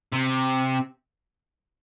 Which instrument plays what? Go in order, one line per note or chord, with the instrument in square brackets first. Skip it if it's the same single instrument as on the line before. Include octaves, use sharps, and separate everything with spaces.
[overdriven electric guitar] C3